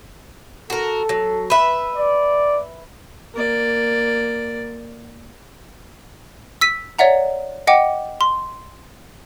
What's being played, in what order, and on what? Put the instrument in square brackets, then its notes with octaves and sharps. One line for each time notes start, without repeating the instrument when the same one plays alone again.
[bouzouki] F#4 A#4 [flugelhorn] A4
[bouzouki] F#3
B4 E5
[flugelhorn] D5
[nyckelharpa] A#3 D5
[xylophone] E6 B6 D#7
C#5 D5 E5 F#5 A#5
D#5 F#5 G5 D6
C6